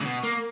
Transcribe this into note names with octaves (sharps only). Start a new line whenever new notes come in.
C#3
B2
A#3